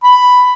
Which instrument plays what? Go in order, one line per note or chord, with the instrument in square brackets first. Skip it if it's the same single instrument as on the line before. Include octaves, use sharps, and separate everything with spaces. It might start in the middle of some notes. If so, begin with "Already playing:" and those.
[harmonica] B5